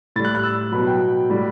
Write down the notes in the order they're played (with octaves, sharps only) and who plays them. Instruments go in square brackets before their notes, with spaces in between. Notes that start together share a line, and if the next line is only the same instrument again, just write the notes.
[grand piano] A2 A6
G3
F#6
F#6
E6
B2 F#3 B5
G5
A2 G3